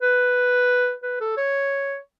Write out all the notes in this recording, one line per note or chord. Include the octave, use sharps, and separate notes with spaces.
B4
B4
A4
C#5